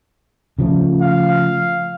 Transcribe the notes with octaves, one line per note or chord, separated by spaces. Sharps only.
C#3 F3 A3
F5